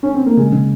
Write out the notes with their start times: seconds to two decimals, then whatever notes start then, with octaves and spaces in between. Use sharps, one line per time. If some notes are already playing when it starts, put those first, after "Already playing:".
0.03 C#4
0.14 C4
0.26 A#3
0.38 C#3 G#3
0.53 C#3